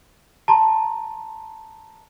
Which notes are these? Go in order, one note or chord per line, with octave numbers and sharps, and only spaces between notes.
A5 A#5 C6